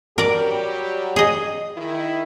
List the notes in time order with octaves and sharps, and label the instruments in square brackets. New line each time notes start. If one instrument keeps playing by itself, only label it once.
[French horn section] F#3 G3 G4 [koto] A#4 D5
[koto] G#4 D#5
[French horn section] D#3 E4